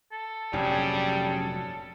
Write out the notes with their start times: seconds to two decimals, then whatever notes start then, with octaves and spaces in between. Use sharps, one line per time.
0.12 A4
0.53 F1 G2 A#2 F#3 G3 C#4 G#4